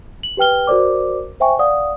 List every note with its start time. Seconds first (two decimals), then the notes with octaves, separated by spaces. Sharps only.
0.23 F#7
0.37 G4 B4 G5 F6 G7
0.67 F#4 A#4 C5 D5 D6
1.40 C5 E5 G5 G#5 C#6
1.59 D5 F5 F#5 D#6